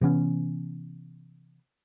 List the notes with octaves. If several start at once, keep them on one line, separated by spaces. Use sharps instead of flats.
C3 E3 B3 C#4